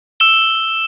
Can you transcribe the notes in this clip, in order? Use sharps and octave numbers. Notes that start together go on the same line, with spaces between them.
E6 E7 G7